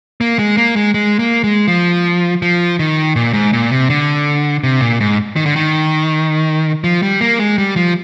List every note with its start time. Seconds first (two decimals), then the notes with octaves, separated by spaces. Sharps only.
0.21 A#3
0.39 G#3
0.57 A#3
0.76 G#3
0.94 G#3
1.19 A#3
1.44 G#3
1.68 F3
2.42 F3
2.79 D#3
3.16 A#2
3.33 G#2
3.53 A#2
3.71 C3
3.90 D3
4.63 C3
4.81 A#2
5.00 G#2
5.36 D#3
5.46 D3
5.56 D#3
6.84 F3
7.02 G3
7.21 A#3
7.39 G#3
7.58 G3
7.76 F3